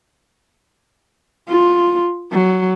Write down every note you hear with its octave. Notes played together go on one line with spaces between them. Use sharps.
F4
F#3